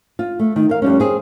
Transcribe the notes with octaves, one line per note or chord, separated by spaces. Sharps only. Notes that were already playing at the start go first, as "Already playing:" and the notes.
F4
A3
D#3
A#4 F5
F2 G3 C#4
C4 G#4